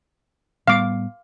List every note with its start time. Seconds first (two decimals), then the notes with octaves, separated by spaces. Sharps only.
0.67 A2 G3 B3 F5 D6